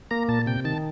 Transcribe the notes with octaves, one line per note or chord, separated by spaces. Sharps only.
A#3 A#5
A#2 A5
C3 G5
D#3 A5